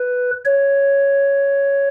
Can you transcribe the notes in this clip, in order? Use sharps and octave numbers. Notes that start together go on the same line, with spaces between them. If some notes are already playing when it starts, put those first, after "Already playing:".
Already playing: B4
C#5